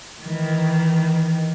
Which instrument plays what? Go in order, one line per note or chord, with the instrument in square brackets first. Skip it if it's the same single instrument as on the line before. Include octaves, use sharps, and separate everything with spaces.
[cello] D#3 E3